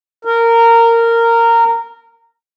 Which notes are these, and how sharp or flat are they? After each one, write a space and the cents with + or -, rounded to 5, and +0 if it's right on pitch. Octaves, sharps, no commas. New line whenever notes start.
A#4 -15